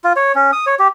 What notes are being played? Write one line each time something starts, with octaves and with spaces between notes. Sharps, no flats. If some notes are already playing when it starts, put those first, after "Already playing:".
F4
C#5
C#4
D#6
C#5
G4